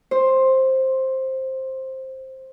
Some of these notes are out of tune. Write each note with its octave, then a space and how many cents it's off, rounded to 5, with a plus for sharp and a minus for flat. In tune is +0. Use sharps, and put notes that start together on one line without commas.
C5 +10